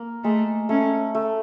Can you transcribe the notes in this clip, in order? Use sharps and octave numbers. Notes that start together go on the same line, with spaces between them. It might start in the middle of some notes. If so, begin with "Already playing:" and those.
Already playing: A#3
G#3 A3
A3 C#4
A3